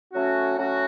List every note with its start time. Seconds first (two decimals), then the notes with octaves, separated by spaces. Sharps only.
0.13 F#3 A3 C#4 F#4
0.58 F#3 A3 C#4 F#4